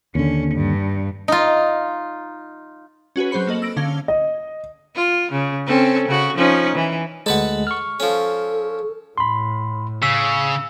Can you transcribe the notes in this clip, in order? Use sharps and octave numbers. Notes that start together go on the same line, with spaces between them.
D#2 D3 C#4
G2
D#4 F4
C#4 F#4 G#4 B4
F#3 C4 C5 B5 C#7
A#3 A4 D#5 F#7
E6 A#6 D7
D3 C#4 F5 G#6 G7
D#5
F4
C#3
C4 C#4 A4
C#3 F#4
F3 C#4 D#4
E3
D2 G#3 A4 B4 F#5
C#6 F6
F3 C#4 A4
A2 B5 C6
C#3 E6 B6